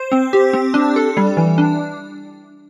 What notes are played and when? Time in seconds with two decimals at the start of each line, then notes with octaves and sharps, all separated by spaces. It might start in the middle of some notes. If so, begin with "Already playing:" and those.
Already playing: C5
0.12 C4
0.33 G4
0.53 C4
0.74 D4
0.96 A4
1.17 G3
1.37 E3
1.58 D4